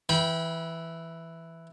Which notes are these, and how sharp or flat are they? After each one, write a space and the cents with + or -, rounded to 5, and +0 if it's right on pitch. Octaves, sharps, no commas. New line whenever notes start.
E3 +0 G5 +0 B5 -30